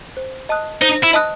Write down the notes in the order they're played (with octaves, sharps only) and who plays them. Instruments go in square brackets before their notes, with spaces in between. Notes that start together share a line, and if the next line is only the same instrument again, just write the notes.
[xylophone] C5
D#5 A5 D#6 F#6
[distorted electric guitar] D#4 [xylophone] C5
[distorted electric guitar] E4
[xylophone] D#5 A5 D#6 F#6